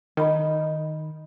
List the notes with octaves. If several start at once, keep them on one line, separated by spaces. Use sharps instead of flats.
D#3 D#4 B5